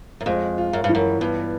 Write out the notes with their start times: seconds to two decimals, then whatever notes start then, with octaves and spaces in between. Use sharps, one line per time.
0.21 F#2
0.26 F2 G#3
0.58 F4
0.73 F#2
0.84 G2
0.89 E3
0.95 F#2
1.20 G2 B3